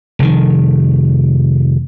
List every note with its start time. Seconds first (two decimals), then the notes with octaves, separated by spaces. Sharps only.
0.19 F1 D#3